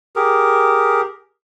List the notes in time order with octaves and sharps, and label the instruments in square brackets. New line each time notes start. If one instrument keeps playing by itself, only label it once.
[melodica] G4 G#4 A#4